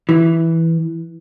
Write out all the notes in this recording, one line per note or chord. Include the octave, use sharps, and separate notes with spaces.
E3